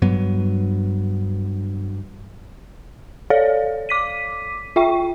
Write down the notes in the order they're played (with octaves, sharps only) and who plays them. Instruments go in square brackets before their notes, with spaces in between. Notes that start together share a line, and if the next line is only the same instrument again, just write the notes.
[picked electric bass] G2 F#3 B3
[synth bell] A4 C#5 D5 F5
D6 B6 D#7
F4 E5 G5 C#6